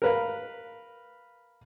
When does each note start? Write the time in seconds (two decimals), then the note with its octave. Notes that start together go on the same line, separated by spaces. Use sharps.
0.02 A#4 B4 F5